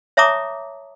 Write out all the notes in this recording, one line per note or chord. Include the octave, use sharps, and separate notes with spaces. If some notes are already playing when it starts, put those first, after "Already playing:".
C#5 E5 A5 A#5 D6 D#6